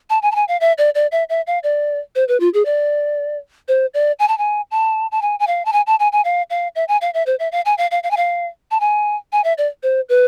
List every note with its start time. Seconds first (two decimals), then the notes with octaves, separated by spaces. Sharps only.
0.10 A5
0.22 G#5
0.32 A5
0.35 G#5
0.48 F5
0.61 E5
0.78 D5
0.95 D5
1.12 E5
1.29 E5
1.47 F5
1.63 D5
2.15 C5
2.28 B4
2.40 F4
2.54 G#4
2.65 D5
3.68 C5
3.94 D5
4.19 G#5
4.28 A5
4.38 G#5
4.71 A5
5.12 A5
5.22 G#5
5.40 G#5
5.47 F5
5.65 A5
5.73 G#5
5.87 A5
6.00 G#5
6.12 G#5
6.25 F5
6.50 F5
6.76 E5
6.88 G#5
7.01 F5
7.14 E5
7.26 C5
7.39 E5
7.52 F5
7.65 G#5
7.78 F5
7.91 F5
8.03 F5
8.11 G#5
8.17 F5
8.71 A5
8.80 G#5
9.32 G#5
9.44 E5
9.58 D5
9.83 C5
10.09 B4